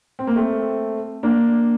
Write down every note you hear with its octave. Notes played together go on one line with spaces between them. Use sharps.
C4
A#3
A3 C4
A#3 D4